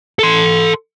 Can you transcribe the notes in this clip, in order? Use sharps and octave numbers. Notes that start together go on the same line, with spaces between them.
A4 C6